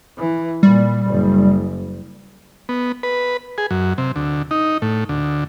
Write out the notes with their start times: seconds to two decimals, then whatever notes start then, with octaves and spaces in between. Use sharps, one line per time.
0.19 E3
0.63 A#2 G3
1.06 F#1
2.69 B3
3.03 B4
3.58 G#4
3.71 F#2
3.98 C3
4.16 D2
4.51 D#4
4.82 A2
5.09 D2